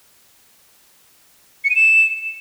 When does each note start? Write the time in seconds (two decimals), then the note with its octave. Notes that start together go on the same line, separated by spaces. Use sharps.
1.64 C#7
1.70 D#7
1.76 E7